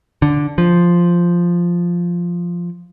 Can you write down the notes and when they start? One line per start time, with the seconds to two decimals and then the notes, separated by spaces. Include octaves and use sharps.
0.22 D3
0.58 F3